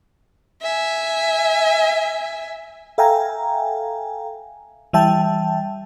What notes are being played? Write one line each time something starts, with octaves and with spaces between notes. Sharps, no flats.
E5 G#5
A4 E5 F5 G5 G#5 A#5
E3 G3 E5 G5 A5